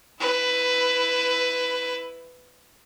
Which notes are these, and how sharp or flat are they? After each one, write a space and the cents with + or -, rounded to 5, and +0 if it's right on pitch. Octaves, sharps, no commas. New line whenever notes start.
E4 +0 B4 +15